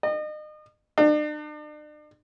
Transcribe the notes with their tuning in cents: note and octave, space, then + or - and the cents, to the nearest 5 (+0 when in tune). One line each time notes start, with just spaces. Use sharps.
D#5 -35
D4 +40